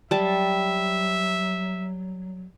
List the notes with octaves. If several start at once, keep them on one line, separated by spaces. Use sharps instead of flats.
F#3 G3 E5 A5